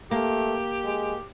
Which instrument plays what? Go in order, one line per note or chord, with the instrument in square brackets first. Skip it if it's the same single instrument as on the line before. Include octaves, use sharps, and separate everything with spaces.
[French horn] A3 [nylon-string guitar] A#3 [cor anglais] G4
[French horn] G#3